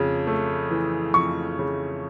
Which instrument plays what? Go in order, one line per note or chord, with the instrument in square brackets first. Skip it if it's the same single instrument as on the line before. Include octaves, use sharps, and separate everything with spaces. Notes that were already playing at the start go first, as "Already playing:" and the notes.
Already playing: [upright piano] F2 C#3
A3
E3
F2 C#6
C#3